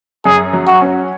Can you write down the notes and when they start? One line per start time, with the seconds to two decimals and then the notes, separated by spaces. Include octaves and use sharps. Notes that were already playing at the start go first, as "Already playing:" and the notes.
0.25 F#2 G#4
0.53 F#3
0.67 F#4
0.81 C#4